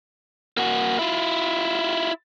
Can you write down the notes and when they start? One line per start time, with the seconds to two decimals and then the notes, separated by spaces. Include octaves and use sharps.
0.57 A#3 F#4
0.99 E4 F4